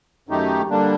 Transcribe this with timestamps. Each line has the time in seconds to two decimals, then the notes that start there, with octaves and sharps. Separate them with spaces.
0.29 F#2 D#3 A3 D#4 G4
0.70 D3 G3 A#3 D4